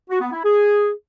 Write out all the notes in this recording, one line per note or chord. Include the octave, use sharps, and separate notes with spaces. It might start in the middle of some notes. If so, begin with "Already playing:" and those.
F#4
B3
E4
G#4